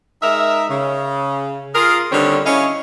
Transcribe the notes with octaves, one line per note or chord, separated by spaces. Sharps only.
G#3 D#4 A#4 E5
C#3
F4 G#4 A#4
D3 D#3 G3 C4 C#4
C#4 E4 C#5 D#5 F5